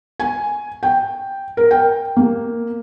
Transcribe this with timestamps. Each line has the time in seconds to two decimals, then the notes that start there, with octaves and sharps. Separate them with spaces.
0.20 G#5
0.83 G5
1.57 A#4
1.71 G5
2.16 A#3